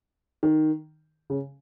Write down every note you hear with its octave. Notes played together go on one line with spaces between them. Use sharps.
D#3
C#3